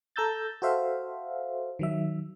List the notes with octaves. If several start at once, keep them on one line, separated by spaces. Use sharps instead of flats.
A4 A#5 E6 G6 A6
F#4 A4 C5 E5 F5
D#3 F#3 E5